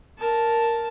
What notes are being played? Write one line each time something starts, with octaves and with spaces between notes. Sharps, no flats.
A#4 A5